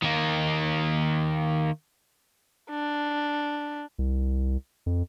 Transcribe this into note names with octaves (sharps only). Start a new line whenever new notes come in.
D#3 A#3
D4
C2
F2